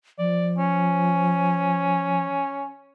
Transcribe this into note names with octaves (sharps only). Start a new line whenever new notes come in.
F3 D5
C#4